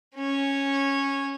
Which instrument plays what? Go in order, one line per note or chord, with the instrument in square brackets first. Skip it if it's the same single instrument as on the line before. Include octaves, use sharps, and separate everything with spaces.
[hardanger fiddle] C#4 C#5